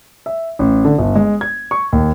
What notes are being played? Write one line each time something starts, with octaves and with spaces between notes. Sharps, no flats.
E5
A1
D3
G1
G#3
G#6
C#6
D#2